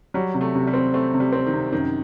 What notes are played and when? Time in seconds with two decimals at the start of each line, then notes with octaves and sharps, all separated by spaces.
0.14 F#3 G3
0.34 C3
0.41 A3
0.55 C3
0.67 G3
0.74 C4
0.94 A3 C4
1.14 C3
1.20 G3
1.33 C4
1.46 D#3
1.53 C3
1.72 F#2 D#3